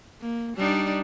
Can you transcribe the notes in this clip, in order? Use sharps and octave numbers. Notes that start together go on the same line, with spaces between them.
A#3
G3 D4 D#4